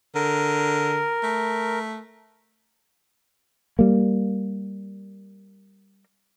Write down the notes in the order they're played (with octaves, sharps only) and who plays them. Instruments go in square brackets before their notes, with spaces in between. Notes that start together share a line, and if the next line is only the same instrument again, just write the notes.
[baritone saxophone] D3 [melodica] A#4
[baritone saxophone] A3
[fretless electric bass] G3 A#3